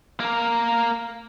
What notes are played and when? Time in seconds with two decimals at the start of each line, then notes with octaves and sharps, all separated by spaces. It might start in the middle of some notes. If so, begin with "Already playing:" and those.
0.20 A#3 A#4